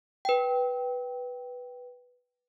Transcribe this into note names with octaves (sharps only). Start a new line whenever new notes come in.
B4 G5